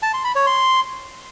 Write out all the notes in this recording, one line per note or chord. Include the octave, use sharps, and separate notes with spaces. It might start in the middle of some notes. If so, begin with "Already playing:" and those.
A5
C6
B5
C#5
C6